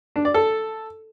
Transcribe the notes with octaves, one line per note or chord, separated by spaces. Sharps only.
D4
D5
A4